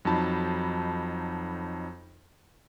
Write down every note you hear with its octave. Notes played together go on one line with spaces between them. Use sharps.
F2 F#3 D#4 A5 B5